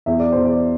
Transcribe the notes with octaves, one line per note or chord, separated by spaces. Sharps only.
E2 E5
D5
E2 C5
D5